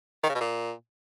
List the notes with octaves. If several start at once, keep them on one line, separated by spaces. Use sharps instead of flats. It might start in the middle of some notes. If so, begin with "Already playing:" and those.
D#3
C#3
B2
A#2